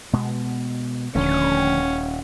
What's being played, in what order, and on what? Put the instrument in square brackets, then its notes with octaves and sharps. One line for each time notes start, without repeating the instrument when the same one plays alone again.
[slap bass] B2 G#3 B3
[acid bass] D#1 [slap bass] D3 F3 A3 [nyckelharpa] C#4